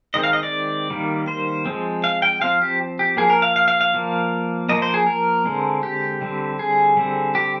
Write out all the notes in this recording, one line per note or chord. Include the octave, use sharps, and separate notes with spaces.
D#3 G#3 C4 D#5
F5
D#5
D5
D#3 G3 A#3
C5
F3 G#3 C4
F5
G5
F3 C4 F5
G4
G4
F3 A#3 G#4
A#4
F5
F5
F5
F5
F3 A#3
F3 A#3 D#5
C5
G#4
A#4
D3 G#3 C4
G4
D3 G3 C4
G#4
D3 G3 C4
G4